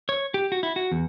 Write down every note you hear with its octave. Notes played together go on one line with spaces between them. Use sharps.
C#5
G4
F#4
E4
F#4
E2